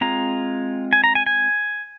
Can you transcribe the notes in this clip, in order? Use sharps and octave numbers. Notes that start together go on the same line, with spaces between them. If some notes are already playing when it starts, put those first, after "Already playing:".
G#3 C4 F4 A#5
G#5
A#5
G#5
G#5